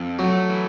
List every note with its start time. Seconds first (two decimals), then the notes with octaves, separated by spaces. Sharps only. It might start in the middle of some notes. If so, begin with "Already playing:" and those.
Already playing: F2
0.19 F#3 A3
0.49 E3